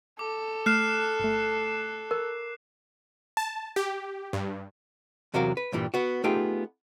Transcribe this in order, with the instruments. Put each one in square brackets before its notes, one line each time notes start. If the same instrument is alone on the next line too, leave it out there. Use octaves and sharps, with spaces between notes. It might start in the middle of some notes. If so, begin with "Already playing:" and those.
[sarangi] A4 [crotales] D6
[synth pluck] A3 [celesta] F6 [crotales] F#6 C7 E7
[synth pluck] G1 A3
[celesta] A#4 [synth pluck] C#6
[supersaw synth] A5
G4
G2
[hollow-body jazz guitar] E2 C3 F#3 F#4 A#4 F5
B4
G2 A#2 E3 G3
B3 F#4
A3 B3 D#4 F4 G4 G#4